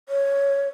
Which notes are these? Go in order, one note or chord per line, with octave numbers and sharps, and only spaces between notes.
C#5